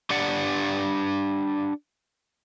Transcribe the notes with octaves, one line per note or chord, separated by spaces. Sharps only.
D4 G4 D5 F#5